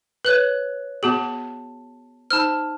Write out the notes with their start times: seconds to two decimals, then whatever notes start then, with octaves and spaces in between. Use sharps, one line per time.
0.25 B4 C#5 F#6 F#7
1.03 B3 F#4 G#4 A5 F#7
2.31 D#4 C5 A5 E6 F6